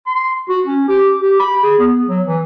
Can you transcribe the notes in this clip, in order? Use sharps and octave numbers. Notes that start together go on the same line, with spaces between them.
C6
F#4
C#4
G4
G4
B5
G#4
B3
F#3
E3